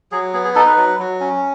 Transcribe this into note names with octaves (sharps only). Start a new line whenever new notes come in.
F#3 G#4
B3 G#4
G#4
D#4 A4
B4
F#3
F#3
C#4